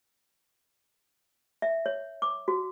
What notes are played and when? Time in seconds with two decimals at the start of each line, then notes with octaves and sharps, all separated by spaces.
1.62 E5
1.86 C#5
2.22 D6
2.48 F#4